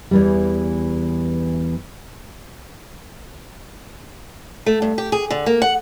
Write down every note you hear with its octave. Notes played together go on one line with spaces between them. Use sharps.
E2 E3 G3
A3
G2
G4
G#4
D3
A#3
F#5